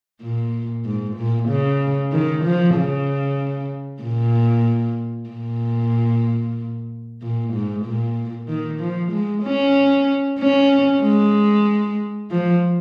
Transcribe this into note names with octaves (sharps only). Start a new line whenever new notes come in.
A#2
G#2
A#2
C#3
D#3
F3
C#3
A#2
A#2
A#2
G#2
A#2
D#3
F3
G#3
C#4
C#4
G#3
F3